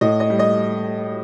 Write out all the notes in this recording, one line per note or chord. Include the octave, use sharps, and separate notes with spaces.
A2 D#5
D#5
G3
D#5